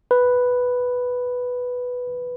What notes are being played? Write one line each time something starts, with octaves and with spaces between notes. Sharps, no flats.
B4